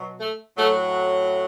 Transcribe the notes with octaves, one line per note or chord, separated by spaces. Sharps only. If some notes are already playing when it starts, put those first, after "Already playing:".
Already playing: B2 F#3
A3
A2 F#3 A3